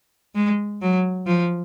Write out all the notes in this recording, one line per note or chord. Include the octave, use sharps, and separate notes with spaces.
G#3
F#3
F3